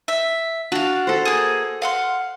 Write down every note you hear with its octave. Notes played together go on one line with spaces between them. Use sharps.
E5
D4 F#4 F5
A4 C5
A#3 G#4
F5 F#5 C6